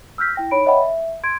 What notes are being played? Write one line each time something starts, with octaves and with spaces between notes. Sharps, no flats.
E6 F6 G6 B6
E4 G5 A#6
D#4 C#5 B5 D7
C#5 D#5 E5 F#5 G5 B5
E5
C6 G#6 D7